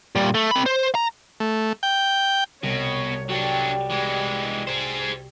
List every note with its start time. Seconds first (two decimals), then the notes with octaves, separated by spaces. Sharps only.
0.15 A#2 G3
0.35 A3
0.51 C4 B5
0.66 C5
0.95 A#5
1.40 A3
1.83 G5
2.63 C2 B2 C#5
3.29 F#3 G3 D4 F#4 A4 G5
3.90 E3 G#3
4.67 G#4 C5